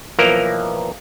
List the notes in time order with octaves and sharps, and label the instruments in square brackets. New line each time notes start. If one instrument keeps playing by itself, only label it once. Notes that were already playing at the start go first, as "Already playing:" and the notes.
[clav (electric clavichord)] B1 E3 F3 A#3 A#4 A#5